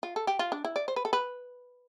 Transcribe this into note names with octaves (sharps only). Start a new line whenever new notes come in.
F4
A4
G4
F4
D4
E4
D5
C5
B4
A4
B4